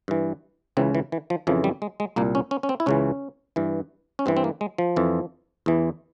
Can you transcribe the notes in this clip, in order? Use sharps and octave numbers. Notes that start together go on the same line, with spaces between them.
G2 E3
C#2 C#3 E3 C4
E3
E3
F3
F2 C#3 E3 F3
G3
G#3
G#3
C2 A#2 A#3
C#4
C#4
C#4
C4
E4
C#2 C#3 E3 C#4
G2 E3
C#4
G2 E3 C4
C4
A#3
G#3
F3
F2 E3
E2 E3